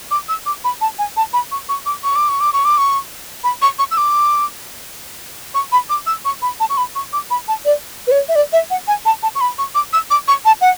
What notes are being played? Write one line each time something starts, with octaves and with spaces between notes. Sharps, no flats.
D6
E6
D6
B5
A5
G#5
A5
B5
C#6
C#6
D6
C#6
D6
C#6
D6
C#6
D6
C#6
B5
C#6
C#6
E6
D6
C#6
B5
D6
E6
C#6
B5
A5
C#6
B5
C#6
D6
B5
A5
D5
B4
C#5
E5
D5
E5
F#5
G#5
A5
A5
C#6
B5
C#6
D6
E6
D6
C#6
A5
F#5